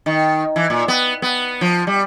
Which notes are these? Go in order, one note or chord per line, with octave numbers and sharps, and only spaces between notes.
D#3
E3
A#2
B3
B3
F3
G3